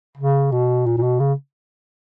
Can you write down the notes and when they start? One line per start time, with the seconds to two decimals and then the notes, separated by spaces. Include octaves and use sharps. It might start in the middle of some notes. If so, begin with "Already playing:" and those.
0.17 C#3
0.52 B2
0.86 A#2
0.97 A#2
1.03 B2
1.20 C#3